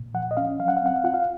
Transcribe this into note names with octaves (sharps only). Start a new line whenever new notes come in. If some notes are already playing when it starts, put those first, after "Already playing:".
Already playing: A#2
F3 F#5
D#5
C#4 F5
F#3 F5
F#5
F5
C4 F#5
F5
F4 F#5
F5